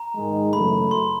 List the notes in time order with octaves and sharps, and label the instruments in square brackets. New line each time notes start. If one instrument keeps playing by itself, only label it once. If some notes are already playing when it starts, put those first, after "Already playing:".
Already playing: [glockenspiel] A#5
[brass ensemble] G#2 D#3 G#3
[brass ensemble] F#2 C#3 E3 A3 [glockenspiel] B5
[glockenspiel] C6